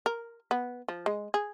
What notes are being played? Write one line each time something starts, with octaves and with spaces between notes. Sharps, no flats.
A#4
B3
F3
G#3
G#4